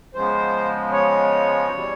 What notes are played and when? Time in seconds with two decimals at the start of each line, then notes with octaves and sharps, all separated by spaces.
0.14 C#3 F3 G#3 B3 C5
0.92 C#5
1.69 E2 B2 G3